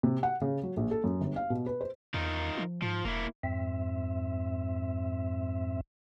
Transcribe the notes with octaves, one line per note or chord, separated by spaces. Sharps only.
C3
F#5
C#3
F#3
A#1
A4
F#2
G1
F5
B2
B4
C5
E2 D#4 F4 A#4
F3
G#2 F3
E1 A#3 E4
F2 G#2 C4 E5